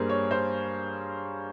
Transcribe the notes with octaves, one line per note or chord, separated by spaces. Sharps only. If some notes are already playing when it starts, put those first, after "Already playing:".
Already playing: G2 G3 A#3 G#4 A#4 C5
C#5
C5